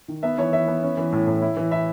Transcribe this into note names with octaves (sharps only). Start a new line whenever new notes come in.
D#3
B3 E5
E3 C#5
E3 E5
B3
C#4
E3
A2
A2
E4
E3
E4 E5